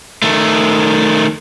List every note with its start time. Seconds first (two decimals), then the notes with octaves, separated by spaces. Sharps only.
0.22 D#3 A3